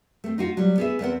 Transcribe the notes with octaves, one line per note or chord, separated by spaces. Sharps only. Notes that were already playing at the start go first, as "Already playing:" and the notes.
A3 C4
D#4 F4 F#4
F#3 G3
B3 G#4 E5
E2 B3 C4 F#5